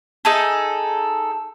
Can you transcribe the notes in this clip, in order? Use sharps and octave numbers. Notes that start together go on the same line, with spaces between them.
D#4 G#4 A4